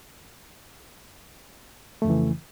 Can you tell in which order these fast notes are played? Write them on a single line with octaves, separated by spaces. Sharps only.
A3 F2 C#3 E3